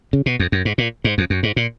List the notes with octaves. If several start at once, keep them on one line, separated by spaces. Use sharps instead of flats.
C#3
B2
F2
F#2
G#2
A#2
G#2
F2
F#2
G#2
A#2